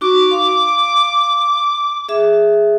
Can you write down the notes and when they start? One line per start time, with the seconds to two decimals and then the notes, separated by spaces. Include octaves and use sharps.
0.01 D#4 F#4 C#6 D6
0.31 F5 C6
2.09 G#4 E5